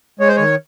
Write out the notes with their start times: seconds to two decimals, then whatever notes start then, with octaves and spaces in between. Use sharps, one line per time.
0.20 G#3 C#5
0.28 C5
0.36 D#3 C#5